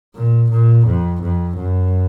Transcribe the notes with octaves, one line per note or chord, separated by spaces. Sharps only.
A#2
A#2
F2
F2
F#2